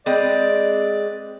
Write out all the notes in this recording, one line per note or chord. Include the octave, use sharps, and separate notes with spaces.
G#3 C4 B4 D5